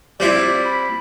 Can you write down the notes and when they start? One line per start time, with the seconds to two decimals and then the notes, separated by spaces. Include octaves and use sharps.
0.20 G3 C4 E4 D5
0.65 B5